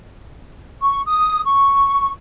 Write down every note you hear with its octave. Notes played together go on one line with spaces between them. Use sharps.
C#6
D#6
C#6